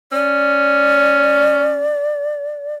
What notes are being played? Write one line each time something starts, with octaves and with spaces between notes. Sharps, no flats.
C#4 D5